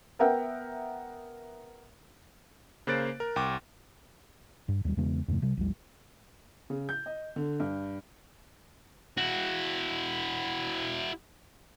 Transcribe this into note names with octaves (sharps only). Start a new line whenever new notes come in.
B3 A#4 E5 F#5 G5
C#3 A#3 C5 F#6 A6 D7
A#4
C2 G5 C#6 D6
G2
D#2 G3
E2 C#3 G#3 B3
E2 G2 C3 A3
C3 G3
A#1 E2 G3
C#3
G6
D#5
D3
G2
E4 F#4